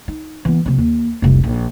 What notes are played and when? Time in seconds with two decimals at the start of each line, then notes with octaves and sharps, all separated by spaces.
0.08 D#4
0.45 E3 B3
0.66 C3 F3
0.78 D#2
1.22 F1 C2
1.43 A#1